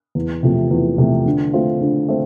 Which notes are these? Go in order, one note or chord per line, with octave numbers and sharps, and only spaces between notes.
E2
C3 F3 A3
E2
C3 F3 A3
D3
A3 C4 F4
D3
A3 C4